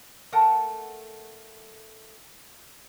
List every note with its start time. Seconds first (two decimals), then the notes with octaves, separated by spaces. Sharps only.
0.32 A3 A4 A#4 F#5 A5